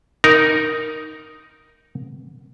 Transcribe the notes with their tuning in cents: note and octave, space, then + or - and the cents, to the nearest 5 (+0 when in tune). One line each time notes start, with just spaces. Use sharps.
D#4 +0 A#4 +0